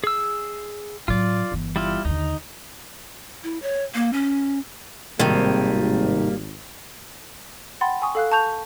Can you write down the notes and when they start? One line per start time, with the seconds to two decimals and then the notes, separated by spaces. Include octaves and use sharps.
0.04 G#4 E6
1.08 A2 F#3 F4 D5
1.52 G1 E3
1.76 G3 E4 F4
2.05 D#2 D3 D#4
3.44 E4
3.62 C#5
3.94 A#3
4.13 C#4
5.19 G#1 A2 C3 D#3 G3 A#3
7.81 F#5 G5 B5 C6 A6
8.02 G#5 C#6 D#6
8.15 A4 F5 F#6
8.32 A5 C#6 G6 F7